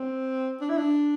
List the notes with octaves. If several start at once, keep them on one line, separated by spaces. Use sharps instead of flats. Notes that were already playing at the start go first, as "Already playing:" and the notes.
Already playing: C4
D4
E4
D4